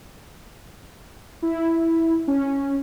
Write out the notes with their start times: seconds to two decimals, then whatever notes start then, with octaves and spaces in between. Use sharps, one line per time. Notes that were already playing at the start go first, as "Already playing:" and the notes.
1.42 E4
2.28 C#4